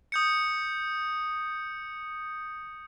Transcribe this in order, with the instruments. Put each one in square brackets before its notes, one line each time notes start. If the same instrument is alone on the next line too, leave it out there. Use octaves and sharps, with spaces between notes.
[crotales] D#6 G6 C#7